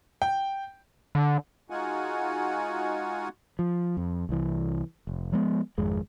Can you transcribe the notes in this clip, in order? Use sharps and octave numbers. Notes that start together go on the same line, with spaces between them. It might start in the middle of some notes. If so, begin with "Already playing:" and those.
G5
D3
G#3 D#4 F4 F#4 F#5 G#5
F3
F2
C2 E3
F1
F3 G#3 A#3 B3
G#1 F2 G#3